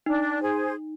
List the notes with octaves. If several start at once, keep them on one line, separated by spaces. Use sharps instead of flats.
D4 D#4
G#4 C5